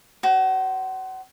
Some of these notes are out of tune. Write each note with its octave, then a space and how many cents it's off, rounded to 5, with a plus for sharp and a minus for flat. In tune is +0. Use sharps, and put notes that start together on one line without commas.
F#4 +30 C5 +0